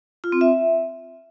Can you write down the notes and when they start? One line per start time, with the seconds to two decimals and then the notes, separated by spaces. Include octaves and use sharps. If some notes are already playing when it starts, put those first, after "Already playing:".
0.24 F4
0.32 C4
0.41 E5